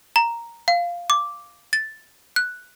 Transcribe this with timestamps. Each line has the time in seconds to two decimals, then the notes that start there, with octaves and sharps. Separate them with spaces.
0.16 A#5
0.68 F5
1.10 D6
1.73 A6
2.36 F#6